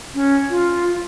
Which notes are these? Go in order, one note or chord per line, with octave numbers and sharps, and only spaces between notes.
C#4
F4